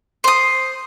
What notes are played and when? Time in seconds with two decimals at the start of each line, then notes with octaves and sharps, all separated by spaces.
0.24 C5 D#6